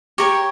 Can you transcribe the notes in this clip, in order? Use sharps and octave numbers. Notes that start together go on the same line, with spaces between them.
G4 A#4 C#5 C#6